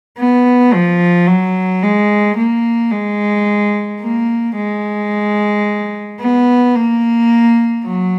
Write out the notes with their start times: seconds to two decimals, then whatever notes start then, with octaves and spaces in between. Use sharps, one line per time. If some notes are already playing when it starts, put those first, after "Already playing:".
0.18 B3
0.73 F3
1.27 F#3
1.83 G#3
2.37 A#3
2.91 G#3
4.01 A#3
4.56 G#3
6.19 B3
6.74 A#3
7.84 F#3